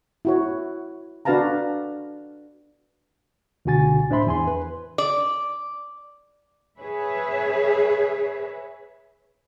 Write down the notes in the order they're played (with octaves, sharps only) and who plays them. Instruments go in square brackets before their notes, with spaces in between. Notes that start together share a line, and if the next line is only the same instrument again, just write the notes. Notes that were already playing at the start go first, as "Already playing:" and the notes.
[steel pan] E4 F#4 C#5
D4 F#4 B4 F5 A5 A#5
[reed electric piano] C#2 B2 D3 F#4 G#5 A6
A2 D4 C5 E5 B5 C6
E2 G#5 C6
B4
[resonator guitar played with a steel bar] D5
[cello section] G#4 B4 C#5 E5